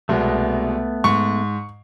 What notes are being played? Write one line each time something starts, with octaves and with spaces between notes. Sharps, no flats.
C2 B2 G#3 A3 B3
G#2 C#6